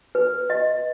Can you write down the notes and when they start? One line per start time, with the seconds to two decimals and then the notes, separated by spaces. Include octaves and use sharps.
0.15 B4
0.50 D#5